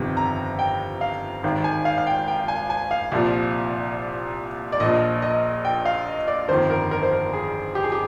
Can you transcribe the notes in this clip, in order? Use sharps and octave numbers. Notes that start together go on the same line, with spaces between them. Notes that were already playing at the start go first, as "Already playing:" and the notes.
Already playing: G1 F2 C3 D#3
A#5
G5
F5
G#1 G#2 D#3
G#5
F5
F5
G5
G5
G#5
G#5
F5
C2 A#2 F3
D5
A#1 A#2 F3 D#5
D#5
G5
F5
D#5
D5
G1 F2 D#3 C5
A#4
A#4
C5
A#4
G#4
G4
G#4
G4